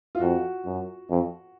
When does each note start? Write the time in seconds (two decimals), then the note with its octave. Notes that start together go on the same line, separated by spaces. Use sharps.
0.15 F4
0.20 F2 F#4
0.65 F#2
1.10 F2